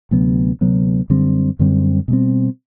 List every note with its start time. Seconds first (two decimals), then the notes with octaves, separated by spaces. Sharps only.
0.11 D2 C3 F#3 B3
0.61 D2 C3 F#3 B3
1.10 F#2 D3 G3 C4
1.59 F#2 D3 G3 C4
2.08 B2 G3 C4